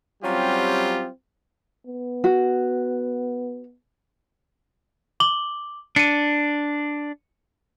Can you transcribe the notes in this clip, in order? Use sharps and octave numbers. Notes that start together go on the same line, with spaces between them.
F#3 G3 C4 C#4 F4 G4
B3
F#4
D6 F#7 G7
D4 C#7 D#7